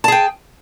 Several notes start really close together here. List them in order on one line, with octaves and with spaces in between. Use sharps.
A5 G#4 G5